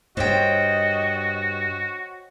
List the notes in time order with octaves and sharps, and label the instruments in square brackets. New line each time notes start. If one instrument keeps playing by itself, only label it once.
[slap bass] G2 [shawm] F#4 [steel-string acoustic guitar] C5 C#5 G5 [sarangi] D#5